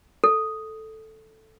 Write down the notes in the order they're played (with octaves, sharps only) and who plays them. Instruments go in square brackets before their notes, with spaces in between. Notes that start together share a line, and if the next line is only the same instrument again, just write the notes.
[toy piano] A4